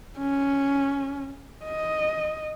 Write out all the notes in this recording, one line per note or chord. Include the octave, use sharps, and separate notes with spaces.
C#4
D#5